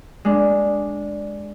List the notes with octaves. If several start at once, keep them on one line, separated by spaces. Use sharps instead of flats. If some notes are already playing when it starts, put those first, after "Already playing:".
G#3 D4